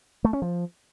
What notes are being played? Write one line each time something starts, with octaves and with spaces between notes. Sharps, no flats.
A3
C#4
F3